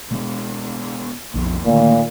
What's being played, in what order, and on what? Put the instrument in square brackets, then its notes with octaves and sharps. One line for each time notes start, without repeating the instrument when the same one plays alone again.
[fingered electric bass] B2 G#3 B3
B1 F2 B2
[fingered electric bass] D2 D#3 [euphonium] A#2